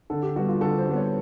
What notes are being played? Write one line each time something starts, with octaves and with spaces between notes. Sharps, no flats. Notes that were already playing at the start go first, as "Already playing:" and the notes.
D3 A4
G4
G3 B3 F#4
F4
D3 A4
C5
G3 B3
C#5